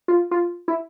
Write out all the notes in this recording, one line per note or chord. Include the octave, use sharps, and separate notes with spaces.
F4
F4
E4